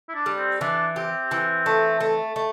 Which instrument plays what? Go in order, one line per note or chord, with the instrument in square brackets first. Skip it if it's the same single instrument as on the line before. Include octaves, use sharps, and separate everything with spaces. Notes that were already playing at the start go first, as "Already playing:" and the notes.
[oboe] E4
D4
[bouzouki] G3
[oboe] C4
[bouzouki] E3 [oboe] D4
[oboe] C4 [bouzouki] G4
[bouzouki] E3
A3
A3
A3